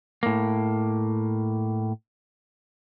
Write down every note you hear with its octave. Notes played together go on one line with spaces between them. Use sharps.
A2 A#3